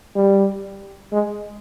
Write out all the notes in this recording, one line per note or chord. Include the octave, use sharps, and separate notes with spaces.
G3
G#3